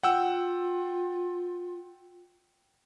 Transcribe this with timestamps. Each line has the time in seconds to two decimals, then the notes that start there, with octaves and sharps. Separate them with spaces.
0.03 F4 F#5 G5 E6